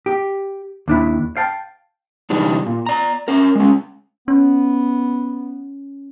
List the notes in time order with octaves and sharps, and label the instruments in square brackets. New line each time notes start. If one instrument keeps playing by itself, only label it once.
[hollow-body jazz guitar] G4
D#2 D4 E4
F5 G5 A5
[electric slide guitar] C3 E3 G3 D4 D#4
A#2
D5 A#5
C#4 A#4
G#3 C#4
[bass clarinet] B3 [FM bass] C#4